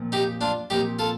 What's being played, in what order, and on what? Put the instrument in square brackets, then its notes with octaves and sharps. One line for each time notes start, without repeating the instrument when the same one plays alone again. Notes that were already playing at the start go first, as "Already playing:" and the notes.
Already playing: [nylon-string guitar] A#2 F3 C4
[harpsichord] D#4 G4
D4 F4
[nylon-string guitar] A#2 F3 C4 [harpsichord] D#4 G4
[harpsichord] F4 A4